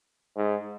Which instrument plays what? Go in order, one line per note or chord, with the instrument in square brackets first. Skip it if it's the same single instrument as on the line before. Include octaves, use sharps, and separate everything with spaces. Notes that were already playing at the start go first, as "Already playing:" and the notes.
[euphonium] G#2